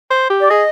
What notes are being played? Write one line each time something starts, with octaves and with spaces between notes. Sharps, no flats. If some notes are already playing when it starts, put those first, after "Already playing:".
C5
G4
D5
G#4 D#5